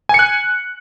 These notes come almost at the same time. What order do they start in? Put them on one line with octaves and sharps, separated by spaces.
G#5 C#7 F#6